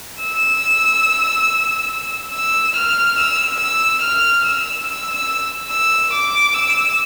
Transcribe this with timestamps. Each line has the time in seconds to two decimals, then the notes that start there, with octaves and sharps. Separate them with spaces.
0.23 E6
2.34 E6
2.77 F6
3.19 E6
3.60 E6
4.02 F6
4.45 E6
4.87 E6
5.14 E6
5.70 E6
6.13 D6
6.54 E6